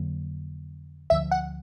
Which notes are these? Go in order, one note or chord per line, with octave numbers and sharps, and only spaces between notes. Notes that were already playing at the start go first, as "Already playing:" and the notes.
Already playing: F2 D3 F#3 A#3
D2 D3 F3 E5
F#5